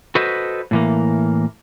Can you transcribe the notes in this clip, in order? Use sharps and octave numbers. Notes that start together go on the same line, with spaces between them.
F#4 A4 B4 C5 D#5
A2 E3 A#3